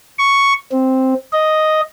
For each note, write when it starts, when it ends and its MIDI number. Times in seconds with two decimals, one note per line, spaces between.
0.18 0.53 85
0.72 1.14 60
1.33 1.81 75